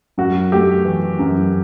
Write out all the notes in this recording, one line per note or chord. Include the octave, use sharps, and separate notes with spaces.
F#2 F#4
A3 G4
E3
F#2